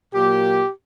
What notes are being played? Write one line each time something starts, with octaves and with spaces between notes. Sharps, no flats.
A#2 F#3 A#3 G4